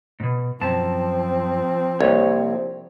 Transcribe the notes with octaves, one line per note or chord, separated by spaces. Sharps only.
G#2 B2
F#2 F3 C4 A5
C2 A#3 C#5